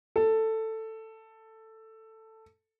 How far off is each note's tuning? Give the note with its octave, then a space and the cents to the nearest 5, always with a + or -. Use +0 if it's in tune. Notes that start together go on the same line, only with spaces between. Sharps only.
A4 +10